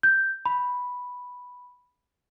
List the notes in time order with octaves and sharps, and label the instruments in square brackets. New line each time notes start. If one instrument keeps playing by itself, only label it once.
[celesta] G6
B5